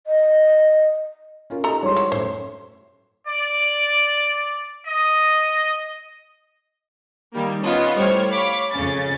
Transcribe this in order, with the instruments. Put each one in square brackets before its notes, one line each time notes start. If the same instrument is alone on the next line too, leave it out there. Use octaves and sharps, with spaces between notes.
[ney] D#5
[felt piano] C#4 F4 A#4
[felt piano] D#4 G4 D#5 [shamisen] A4 A#5
[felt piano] G3 G#3 [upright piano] C#5 C6
[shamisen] F#3
[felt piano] F#2 A2 [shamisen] C5
[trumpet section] D5
D#5
[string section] D#3 G3 A#3
B3 C#4 F4 D#5
A2 G3 C5 C#5 F6
C#5 F5 B5 C#6 D6 B6
F2 C#3 C#4 A6